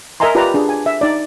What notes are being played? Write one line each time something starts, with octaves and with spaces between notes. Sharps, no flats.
A#4 D#5 E5 G#5 A#5 C6
F4 G4 B4 D5 F5 A#5
D4 G#4
G#5
E5
D#4 D5